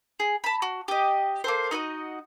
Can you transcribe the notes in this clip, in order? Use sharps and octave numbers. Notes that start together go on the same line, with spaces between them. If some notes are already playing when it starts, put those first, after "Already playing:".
G#4
A5 B5
F#4
G4 D#5
A#3 A4 C5
D#4 F#4 C5 D#5